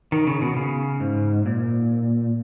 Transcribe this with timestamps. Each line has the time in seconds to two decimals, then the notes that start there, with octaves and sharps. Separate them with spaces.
0.12 D#3
0.27 C#3
0.41 B2
0.57 C#3
1.00 G#2
1.46 A#2